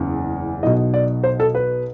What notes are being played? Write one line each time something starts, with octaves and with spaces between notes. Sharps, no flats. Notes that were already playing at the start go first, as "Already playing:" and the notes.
Already playing: F#1 E2 C#3 E3
B1 B2 D#5
D5
C5
A4
B4